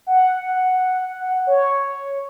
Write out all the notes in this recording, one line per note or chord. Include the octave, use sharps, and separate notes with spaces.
F#5
C#5